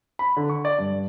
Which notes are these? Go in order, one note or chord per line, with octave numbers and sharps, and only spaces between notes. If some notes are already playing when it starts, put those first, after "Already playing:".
B5
D3
C#6
D5
G2